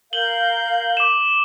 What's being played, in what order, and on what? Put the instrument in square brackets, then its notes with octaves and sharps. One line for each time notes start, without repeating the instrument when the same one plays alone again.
[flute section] A#4 F5 G6 [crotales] F#7 G7
[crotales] D6 E7